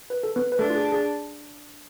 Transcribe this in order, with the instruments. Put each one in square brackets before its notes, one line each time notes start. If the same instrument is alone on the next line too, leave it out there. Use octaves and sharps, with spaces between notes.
[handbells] B4
A4
B3 B4
B4
[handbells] A3 A4 [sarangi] D4
[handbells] F4
G#4
G#4